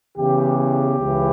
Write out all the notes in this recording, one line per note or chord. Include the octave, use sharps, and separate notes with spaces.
E2 C#3 E3 G4
G4
C#2 C#3 E3